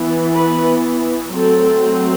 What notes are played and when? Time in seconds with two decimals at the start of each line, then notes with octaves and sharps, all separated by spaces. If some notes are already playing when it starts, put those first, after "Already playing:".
Already playing: E3 B3
0.32 B4
1.33 F#3 A3 C4 A4